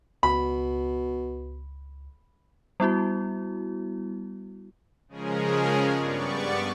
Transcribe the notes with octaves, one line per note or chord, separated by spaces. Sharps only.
C#2 B2 B5
G3 B3 E4 F#4
C#3 F3 G#3 C#4 G#4 A#4
G2 B3 D5 C#6